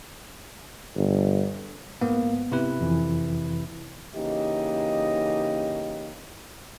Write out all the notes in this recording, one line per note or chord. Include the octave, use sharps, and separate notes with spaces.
G1
G#2 A#3 B3
C3 E4 B4
F2 E3
C#3 E3 A#3 D#4 G4 D#5